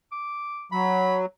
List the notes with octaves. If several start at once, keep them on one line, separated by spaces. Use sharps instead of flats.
D6
F#3 B5